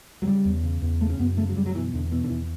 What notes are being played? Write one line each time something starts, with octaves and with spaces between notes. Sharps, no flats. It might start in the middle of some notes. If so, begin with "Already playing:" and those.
F#3
C#3 G3
E2
C#3
E2
C#3 A3
C#4
F#2 B3
C#3 A3
F#3
F#2 G3
F#3
B2 E3
E2 D3
B2 E3
D3
E2 E3